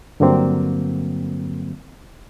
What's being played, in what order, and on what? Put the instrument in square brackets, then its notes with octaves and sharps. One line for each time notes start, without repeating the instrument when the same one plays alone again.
[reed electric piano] G2 D3 F#3 A#3 C4